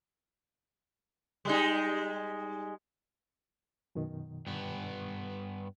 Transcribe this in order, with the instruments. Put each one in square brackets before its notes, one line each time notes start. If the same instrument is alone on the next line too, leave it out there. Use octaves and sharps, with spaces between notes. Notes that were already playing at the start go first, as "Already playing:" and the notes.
[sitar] G3 G#3 D#4
[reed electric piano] F#2 B2 D#3
[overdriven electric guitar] G2 B3